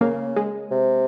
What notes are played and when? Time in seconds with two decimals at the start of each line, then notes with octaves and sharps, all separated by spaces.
0.01 C#3 A#3
0.36 G#3
0.71 C3